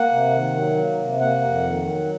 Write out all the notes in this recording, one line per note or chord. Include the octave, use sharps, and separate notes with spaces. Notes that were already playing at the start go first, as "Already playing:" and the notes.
Already playing: A#3 F#5
C3
D#3
F#3
A#3
C3
A#3 F#5
F2
D#3
F#3